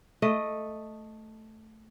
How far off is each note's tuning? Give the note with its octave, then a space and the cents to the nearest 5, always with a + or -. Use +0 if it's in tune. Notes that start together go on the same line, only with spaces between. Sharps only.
A3 +0 D#5 +0